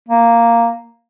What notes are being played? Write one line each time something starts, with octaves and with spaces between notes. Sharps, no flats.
A#3